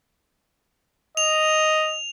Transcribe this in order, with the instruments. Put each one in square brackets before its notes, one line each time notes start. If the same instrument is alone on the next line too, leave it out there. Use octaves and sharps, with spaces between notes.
[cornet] D#5 [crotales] F7